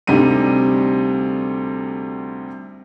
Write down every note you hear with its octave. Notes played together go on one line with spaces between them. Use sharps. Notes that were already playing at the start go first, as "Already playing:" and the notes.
D2 C3 G3 D#4 D#7